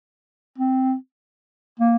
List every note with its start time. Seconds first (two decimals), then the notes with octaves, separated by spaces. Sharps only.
0.58 C4
1.80 A#3